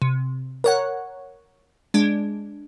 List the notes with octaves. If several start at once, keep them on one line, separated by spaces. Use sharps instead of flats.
C3
A#4 C#5 F#5
G#3 D4